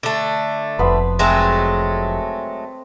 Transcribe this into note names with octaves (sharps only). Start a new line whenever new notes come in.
D3 A3
F1 F2 B3 C5 B5
F#3 G#3 A3 C4